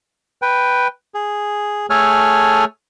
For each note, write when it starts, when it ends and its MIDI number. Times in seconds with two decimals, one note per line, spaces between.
0.42 0.87 71
0.42 0.87 79
1.14 1.86 68
1.90 2.65 57
1.90 2.65 68
1.90 2.65 69
1.90 2.65 73
1.90 2.65 80
1.90 2.65 89